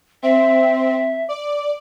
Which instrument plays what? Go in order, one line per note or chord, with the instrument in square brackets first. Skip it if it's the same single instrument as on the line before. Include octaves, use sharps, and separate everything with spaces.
[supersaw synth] C4 [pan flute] E5
[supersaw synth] D5